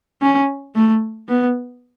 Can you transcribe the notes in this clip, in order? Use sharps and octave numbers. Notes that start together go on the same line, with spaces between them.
C#4
A3
B3